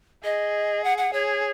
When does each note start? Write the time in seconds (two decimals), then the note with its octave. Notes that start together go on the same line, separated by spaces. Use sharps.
0.24 G#4 D#5
0.84 F#5
0.98 F#5
1.13 G#4 C#5